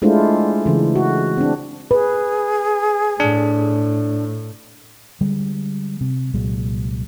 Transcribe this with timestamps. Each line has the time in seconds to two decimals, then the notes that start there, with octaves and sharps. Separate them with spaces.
0.02 G#3 A3 D4 E4 F4 C5
0.66 C#3 E3
0.96 F#4
1.37 C4 D4
1.91 G#4 B4
3.20 A2 D4
5.21 D3 G3 G#3
6.01 C3
6.34 C2 A#2 F#3 G#3